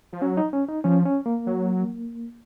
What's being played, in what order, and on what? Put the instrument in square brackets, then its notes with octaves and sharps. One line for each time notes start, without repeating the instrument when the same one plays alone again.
[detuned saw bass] F3
[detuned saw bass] F#3 [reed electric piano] C#4
[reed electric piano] D#4
C#4
D#4
[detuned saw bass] F3 [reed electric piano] C#4
[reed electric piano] C#4
A#3
[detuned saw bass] F#3